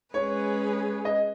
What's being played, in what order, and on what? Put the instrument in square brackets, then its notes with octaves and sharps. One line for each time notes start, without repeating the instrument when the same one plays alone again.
[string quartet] G#3 C#4 G#4 B4 [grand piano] C#5
[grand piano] D#5